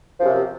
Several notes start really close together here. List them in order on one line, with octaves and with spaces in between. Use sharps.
F3 F#2 C3